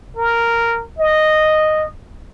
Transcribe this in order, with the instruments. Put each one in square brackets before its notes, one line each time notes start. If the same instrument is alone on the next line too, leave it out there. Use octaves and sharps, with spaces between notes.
[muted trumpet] A#4
D#5